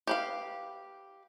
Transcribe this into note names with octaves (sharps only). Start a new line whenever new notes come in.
G4 B4 F5